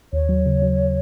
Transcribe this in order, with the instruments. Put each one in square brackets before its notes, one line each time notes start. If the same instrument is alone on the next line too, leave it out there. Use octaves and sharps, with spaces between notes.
[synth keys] D#2 [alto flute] C#5
[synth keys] F#3
C#3
F#3